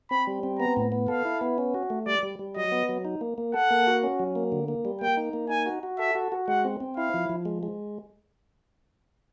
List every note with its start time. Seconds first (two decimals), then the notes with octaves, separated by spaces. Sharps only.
0.11 C4 B5
0.27 G3
0.43 C4
0.59 B3 A#5
0.77 A2
0.92 B3
1.08 A4 F5
1.25 E4
1.41 B3
1.58 C#4
1.74 F#4
1.90 A3
2.06 G3 D5
2.23 G3
2.39 G3
2.56 F#3 D#5
2.72 B3
2.89 F#3
3.05 D#4
3.21 A#3
3.38 A#3
3.54 A4 F#5
3.71 A#3
3.87 F#4
4.03 C#4
4.19 F#3
4.36 A#3
4.52 D3
4.68 A#3
4.85 G3
5.01 A#3 G5
5.17 D#4
5.33 A#3
5.50 D#4 G#5
5.66 F#4
5.83 F#4
5.99 A4 E5
6.15 F#4
6.32 F#4
6.48 G#3 F#5
6.65 C4
6.80 C4
6.97 E4 F5
7.14 F3
7.29 F3
7.45 G#3
7.63 G#3